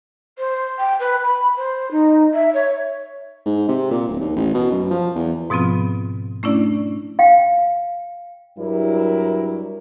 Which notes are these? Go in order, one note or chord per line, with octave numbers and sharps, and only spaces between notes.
C5
G5
B4
B5
C5
D#4
E5
C#5
G#2
C3
A#2
D1
D#2
A1
B2
F#2
F3
E2
G#2 B2 F3 B3 C4 F4
A3 C#4 D4 E4 D5
F5 G5
G2 F#3 G3 E4 A#4